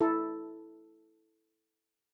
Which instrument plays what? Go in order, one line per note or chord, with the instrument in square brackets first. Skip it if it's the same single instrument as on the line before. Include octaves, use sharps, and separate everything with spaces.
[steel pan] E4 A4